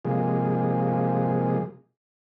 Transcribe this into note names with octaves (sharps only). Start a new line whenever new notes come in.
C3 F3 G#3 A#3 G#4